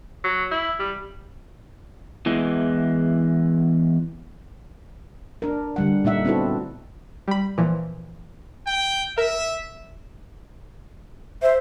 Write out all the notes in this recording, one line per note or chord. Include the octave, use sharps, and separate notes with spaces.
F#3
E4
G3
E2 E3 G#3
D4 A#4
D3 G3 F#5
A#2 A3 D#4 E5 F#5
B3 C4 D4 E4 F#4 A4
G3 B5
A#2 E3 F3
G5
A#4 E5
C5 E5